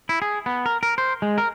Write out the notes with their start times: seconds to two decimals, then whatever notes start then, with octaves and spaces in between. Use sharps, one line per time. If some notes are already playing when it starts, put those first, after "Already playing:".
0.09 E4
0.22 G#4
0.46 B3
0.66 A#4
0.83 A#4
0.98 C5
1.22 G#3
1.38 A#4